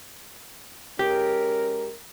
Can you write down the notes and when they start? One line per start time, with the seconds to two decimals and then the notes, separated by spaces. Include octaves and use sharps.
0.99 G#3 C#4 G4 A#4